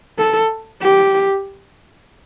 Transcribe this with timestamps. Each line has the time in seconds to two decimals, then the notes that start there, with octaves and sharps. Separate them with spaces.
0.18 A4
0.82 G4